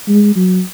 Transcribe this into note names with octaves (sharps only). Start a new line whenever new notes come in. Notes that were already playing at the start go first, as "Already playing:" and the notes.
G#3
F#3